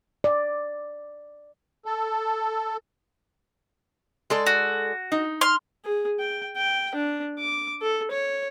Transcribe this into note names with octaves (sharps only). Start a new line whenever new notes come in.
D5
A4
G#3 A4 D5
F#4
D#4
C6 F6
G#4
G5
G5
D4
D6
A4
C#5